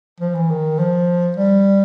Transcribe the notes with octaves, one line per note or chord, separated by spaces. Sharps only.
F3
E3
D#3
F3
G3